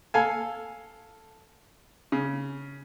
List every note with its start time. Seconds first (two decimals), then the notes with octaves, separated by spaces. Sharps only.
0.14 A4 F5 G#5
2.12 C#3